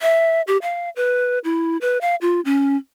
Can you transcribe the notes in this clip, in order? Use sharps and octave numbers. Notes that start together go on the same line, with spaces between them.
E5
G4
F5
B4
E4
B4
F5
F4
C#4